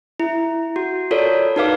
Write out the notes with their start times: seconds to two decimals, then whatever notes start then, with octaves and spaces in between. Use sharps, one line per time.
0.20 E4
0.76 F#4
1.11 F4 A4 A#4 C#5 D5
1.56 D#4 F#4 A#4 B4 F5 D6